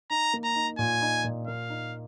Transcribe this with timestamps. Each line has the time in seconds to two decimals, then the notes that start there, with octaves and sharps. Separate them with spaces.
0.10 D#4 A#5
0.33 A#3
0.44 A#5
0.56 D#4
0.78 A#2 G#5
1.02 D#4
1.24 A#2
1.47 A#3 F5
1.70 D#4